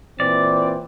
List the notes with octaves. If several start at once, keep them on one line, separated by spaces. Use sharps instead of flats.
A#2 E3 C4 D5